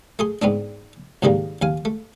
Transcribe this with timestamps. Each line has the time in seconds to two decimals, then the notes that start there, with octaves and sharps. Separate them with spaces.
0.19 A3 G#4 C6
0.42 G#2 B3 C4 D4
1.22 C2 G#2 D#3 E3 G3 A#3
1.62 D#2 F5 G#5
1.85 A3